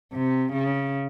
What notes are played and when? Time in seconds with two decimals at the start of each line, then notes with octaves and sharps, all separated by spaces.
0.13 C3
0.53 C#3